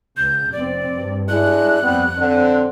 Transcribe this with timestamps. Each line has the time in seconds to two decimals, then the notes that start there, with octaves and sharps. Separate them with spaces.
0.17 C#2 G6
0.52 F1 C4 D5
0.90 G2
1.29 G#3 D4 E4 F#6
1.83 F2 G3 B3 C4
2.17 D3 C4